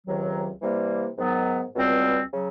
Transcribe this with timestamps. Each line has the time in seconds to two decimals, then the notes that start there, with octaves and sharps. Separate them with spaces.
0.05 C#2 C3 D#3 F#3
0.61 C3 E3 G3 A#3
1.18 G#2 D#3 F#3 B3
1.75 C#2 B2 G3 C4
2.32 C#3 F#3